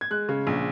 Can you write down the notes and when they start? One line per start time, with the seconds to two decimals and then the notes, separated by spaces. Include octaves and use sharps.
0.01 G#6
0.11 G#3 F#6
0.29 C#3
0.47 A#1